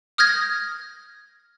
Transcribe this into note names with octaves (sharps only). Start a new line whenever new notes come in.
D#6 F6 G6 G#6 A#6